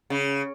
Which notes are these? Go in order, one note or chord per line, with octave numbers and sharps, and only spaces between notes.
C#3